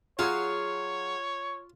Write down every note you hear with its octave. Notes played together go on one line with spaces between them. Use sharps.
F#3 F4 G#4 C#5